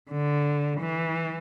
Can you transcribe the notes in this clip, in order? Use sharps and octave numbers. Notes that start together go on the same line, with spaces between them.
D3
E3